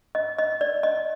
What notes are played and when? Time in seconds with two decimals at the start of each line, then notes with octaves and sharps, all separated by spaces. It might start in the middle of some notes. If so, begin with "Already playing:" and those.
0.15 D#5
0.39 D#5
0.61 D5
0.83 D#5